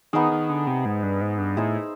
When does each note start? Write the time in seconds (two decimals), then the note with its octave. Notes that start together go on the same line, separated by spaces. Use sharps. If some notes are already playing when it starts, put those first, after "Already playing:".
0.13 D#3 B3 D#4 G#4
0.32 D#3
0.49 D3
0.67 C3
0.85 G#2
1.03 G2
1.21 G#2
1.38 G2
1.57 A2 D#4 G#4 C5 E5